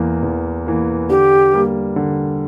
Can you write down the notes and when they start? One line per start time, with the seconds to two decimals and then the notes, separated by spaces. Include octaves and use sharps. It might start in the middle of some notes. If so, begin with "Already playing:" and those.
Already playing: E2 E3 A#3
0.23 E2
0.66 E3 A#3
1.10 D3 G4
1.53 G3 A#3
1.96 D3